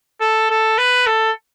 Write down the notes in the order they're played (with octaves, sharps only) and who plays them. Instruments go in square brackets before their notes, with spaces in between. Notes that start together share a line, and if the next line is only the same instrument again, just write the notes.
[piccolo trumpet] A4
A4
B4
A4